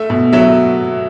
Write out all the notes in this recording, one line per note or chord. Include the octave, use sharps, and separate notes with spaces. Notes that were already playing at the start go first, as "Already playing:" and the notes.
Already playing: A3 E5
B2
F#3 E5